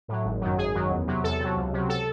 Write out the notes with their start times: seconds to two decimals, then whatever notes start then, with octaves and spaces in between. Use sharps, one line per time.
0.08 A2 F#3
0.25 G#1
0.41 F#2 D#3 F#3
0.58 G#1 G#4
0.74 F#2 D#3 F#3
0.90 E2
1.07 C3 F#3
1.23 E2 A4
1.40 C3 F#3
1.56 C#2
1.73 C3 F#3
1.89 A4